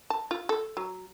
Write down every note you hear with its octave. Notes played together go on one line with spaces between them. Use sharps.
A5
F4
A4
F#3